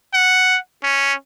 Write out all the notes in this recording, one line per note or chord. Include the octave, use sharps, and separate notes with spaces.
F#5
C#4